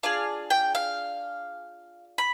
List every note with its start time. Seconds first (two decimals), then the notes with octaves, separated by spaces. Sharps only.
0.03 D4 F4 G#4 F5
0.50 G5
0.75 F5
2.18 B5